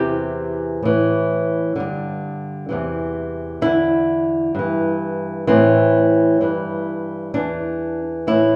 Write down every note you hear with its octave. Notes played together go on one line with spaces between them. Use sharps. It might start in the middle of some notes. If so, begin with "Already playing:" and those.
Already playing: E2 C3 E3 G4
A2 E3
G2 D3
E2 C3 E3
E2 D3 E4
G2 E3
A2 E3 C4
G2 E3
E2 E3 D4
A2 E3 E4